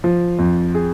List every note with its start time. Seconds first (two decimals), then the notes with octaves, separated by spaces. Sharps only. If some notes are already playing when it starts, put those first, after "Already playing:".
0.04 F3
0.39 F2
0.75 G#4